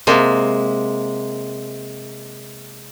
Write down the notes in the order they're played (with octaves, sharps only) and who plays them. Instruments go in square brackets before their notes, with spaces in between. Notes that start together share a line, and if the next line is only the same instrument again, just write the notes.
[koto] C3 G#3 A#3